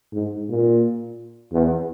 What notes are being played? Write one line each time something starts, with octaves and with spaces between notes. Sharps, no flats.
G#2
A#2
E2